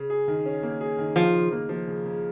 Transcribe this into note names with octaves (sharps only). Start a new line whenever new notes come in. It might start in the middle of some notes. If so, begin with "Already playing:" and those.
Already playing: C#3
G#4
D#3
C#4
A#3
G#4
D#3
C#3 F3
C#3
A#3
F3
C#3
C#3